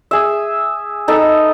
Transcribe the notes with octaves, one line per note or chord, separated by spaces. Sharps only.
G#4 E5
D#4 A4 B4